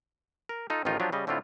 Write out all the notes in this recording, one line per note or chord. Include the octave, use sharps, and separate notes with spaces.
A#4
D#4 F4 A4
A1 D#3 F3 D#4 F4
F3 F#3 D4 F4 G4
C#3 G3 D#5
A2 D3 A3 C4 E4 F4